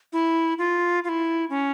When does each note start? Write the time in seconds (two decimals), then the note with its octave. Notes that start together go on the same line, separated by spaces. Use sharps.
0.13 E4
0.59 F4
1.04 F4
1.09 E4
1.50 C#4